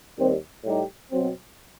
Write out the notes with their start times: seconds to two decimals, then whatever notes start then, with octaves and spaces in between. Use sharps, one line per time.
0.16 D#2 D#3 G3 C4
0.64 A2 G3 D#4 G4
1.12 B2 F#3 C4